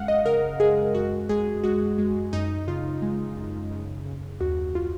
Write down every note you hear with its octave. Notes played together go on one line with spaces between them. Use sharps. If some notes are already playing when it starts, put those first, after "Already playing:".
Already playing: F#2 G#3 F5 F#5
D#5
C#3 A#4
G#3 G#4
F#2 F#4
G#3 G#4
G#3 F#4
G#3
F#2 D#4
C#3 F4
G#3
F#2
C#3
C#3
D#2 F#4
F4